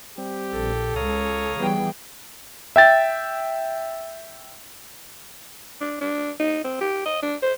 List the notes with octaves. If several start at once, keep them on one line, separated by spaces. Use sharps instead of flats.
G3 C4 G4
A#1 A4
C#2 C#5 F5 A#5 D#6
E3 G3 B3 G#4 G5
E5 G5 A6
D4
D4
D#4
C4
G4
D#5
D4
C5